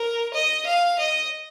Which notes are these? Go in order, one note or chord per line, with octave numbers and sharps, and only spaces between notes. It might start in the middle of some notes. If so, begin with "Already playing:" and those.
Already playing: A#4
D#5
F5
D#5